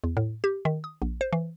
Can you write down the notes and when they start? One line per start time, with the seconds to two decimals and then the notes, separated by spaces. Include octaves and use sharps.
0.04 E2
0.17 A2
0.44 G4
0.65 D#3
0.84 D#6
1.02 A#1
1.21 C5
1.33 E3